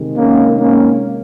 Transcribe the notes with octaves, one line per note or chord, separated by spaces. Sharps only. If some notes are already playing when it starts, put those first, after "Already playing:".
Already playing: C3 D#3 G#3
A#3 C#4
A#3 C#4